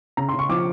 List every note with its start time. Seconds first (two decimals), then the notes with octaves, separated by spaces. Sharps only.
0.17 C#3 A#5
0.29 C6
0.34 C#3
0.39 C#6
0.49 F3 D6